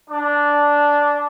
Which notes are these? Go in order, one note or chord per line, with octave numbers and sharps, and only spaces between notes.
D4